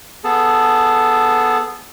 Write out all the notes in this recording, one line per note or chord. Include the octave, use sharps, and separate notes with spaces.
B3 G#4 A4 A5